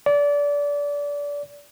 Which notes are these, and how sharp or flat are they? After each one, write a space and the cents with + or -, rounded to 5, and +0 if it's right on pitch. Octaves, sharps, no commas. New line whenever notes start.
D5 -25